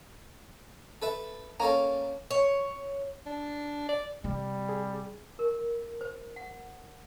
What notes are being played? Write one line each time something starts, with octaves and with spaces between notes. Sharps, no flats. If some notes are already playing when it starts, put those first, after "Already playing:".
A4 B4 E5
A#3 C#4 A4 A#5
C#5
D4
D5
C3 G3
G#4
A#4
C5
F#5